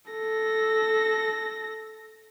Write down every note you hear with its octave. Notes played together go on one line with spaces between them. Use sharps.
A4 A#6